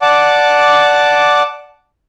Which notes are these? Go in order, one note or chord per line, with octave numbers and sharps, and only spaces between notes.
D5 F#5 A5 D6